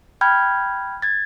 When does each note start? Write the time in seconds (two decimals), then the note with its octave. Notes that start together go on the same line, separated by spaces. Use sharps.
0.21 G5 B5 F6 G6 G#6
1.02 G#6 A6